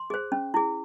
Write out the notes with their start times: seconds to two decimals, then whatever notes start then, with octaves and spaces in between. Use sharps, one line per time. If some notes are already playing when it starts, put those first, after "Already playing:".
Already playing: C6
0.10 G#4 C5
0.32 C#4
0.54 E4 G#4